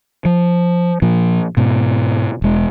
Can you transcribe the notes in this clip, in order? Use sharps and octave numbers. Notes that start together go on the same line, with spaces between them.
F3
A#2 F3
G#2 B2
E1 G#3